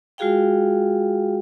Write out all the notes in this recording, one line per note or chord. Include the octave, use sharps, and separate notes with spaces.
G#3 F4 F#4 G#4 F5 G5